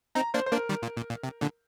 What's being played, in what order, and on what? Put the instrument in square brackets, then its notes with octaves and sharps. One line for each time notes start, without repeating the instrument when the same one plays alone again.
[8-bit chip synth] C4 D#4 [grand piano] A#5
[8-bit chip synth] A#3 D4 [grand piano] C5
[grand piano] C5
[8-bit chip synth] A#3 D4 [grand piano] A#4
[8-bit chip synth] D#3 G3
A#2
A#2
A#2
C3
A#2 D3